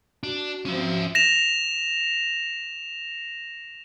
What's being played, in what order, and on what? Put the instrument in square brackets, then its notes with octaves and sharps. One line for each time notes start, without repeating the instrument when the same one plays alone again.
[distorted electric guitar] D4 [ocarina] F#4
[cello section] F3 C4 [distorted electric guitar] C#4 E5
[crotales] A#6 E7 F7